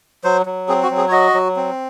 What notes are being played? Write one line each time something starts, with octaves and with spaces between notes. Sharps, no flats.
F#3 C5
F#3
C4 G#4
F#4
F#3
G#4
C#5
F#4 D#5
F#3
C4